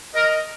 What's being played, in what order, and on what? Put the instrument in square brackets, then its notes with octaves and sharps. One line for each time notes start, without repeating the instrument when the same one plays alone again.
[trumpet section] A#4 [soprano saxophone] D#5